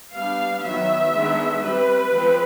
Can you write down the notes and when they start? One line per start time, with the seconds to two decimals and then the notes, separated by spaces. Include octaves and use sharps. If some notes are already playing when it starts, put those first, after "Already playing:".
0.13 G3 B3 D4 F5
0.62 D#3 F#3 B3 E5
1.12 D#3 G#3 B3 D4
1.61 G3 C4 B4
2.10 F3 G#3 C4